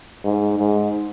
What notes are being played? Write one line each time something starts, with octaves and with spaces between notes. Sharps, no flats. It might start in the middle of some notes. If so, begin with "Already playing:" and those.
G#2
G#2